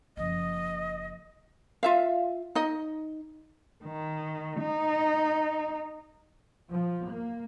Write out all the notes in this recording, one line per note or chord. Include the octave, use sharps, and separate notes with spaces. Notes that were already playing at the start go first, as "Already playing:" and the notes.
F#1 F3 D#5
F4 E5 F5
D#4 D#5
D#3
D#4
F3
A#3